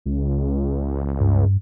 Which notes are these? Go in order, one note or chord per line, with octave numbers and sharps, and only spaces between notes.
C#2
G2